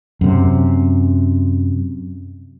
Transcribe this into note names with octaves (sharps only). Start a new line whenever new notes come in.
F#2 C3